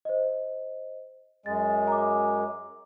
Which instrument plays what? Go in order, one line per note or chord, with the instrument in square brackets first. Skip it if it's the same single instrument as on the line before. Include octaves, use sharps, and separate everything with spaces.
[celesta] C5 D#5
[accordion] F#2 G#3 [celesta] A6
[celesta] A#5 D6